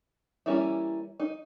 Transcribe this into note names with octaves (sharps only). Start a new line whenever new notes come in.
E3 G3 A#3 C#4 E4
D#4